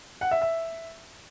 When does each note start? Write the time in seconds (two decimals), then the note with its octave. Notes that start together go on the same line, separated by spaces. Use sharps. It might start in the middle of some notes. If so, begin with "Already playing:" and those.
0.21 F#5
0.31 E5
0.42 E5